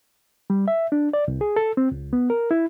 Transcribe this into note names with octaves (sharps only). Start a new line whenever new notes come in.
G3
E5
D4
D5
C2
G#4
A4
C4
C#2
B3
A#4
E4